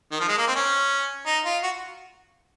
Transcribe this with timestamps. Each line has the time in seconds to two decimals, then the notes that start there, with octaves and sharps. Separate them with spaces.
0.11 D#3
0.20 F3
0.28 G#3
0.38 A#3
0.47 C4
0.56 C#4
1.26 D#4
1.45 F4
1.63 F#4